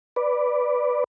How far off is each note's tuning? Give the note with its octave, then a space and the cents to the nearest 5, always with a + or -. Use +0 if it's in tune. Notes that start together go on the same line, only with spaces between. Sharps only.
B4 +0 D5 +0